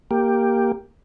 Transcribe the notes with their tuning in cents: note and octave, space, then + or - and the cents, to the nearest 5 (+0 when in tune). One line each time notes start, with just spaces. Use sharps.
A#3 +0 G4 +5